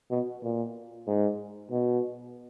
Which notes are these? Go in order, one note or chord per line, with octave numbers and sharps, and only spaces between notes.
B2
A#2
G#2
B2